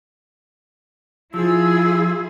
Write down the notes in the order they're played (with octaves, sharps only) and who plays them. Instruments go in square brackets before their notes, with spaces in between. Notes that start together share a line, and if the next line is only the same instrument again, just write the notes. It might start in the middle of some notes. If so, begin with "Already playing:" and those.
[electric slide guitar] F3 [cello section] E4 F4 G#4 [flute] E6